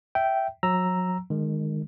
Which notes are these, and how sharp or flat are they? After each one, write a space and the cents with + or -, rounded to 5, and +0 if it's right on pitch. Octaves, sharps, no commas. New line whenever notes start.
E5 +0 G5 -10
F#3 -30 A#5 +0 E6 +0
D#3 -25 G#3 +0